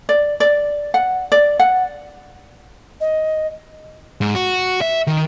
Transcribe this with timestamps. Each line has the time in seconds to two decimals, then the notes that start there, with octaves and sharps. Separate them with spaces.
0.09 D5
0.40 D5
0.94 F#5
1.32 D5
1.60 F#5
3.01 D#5
4.21 G#2
4.35 F#4
4.81 E5
5.07 D#3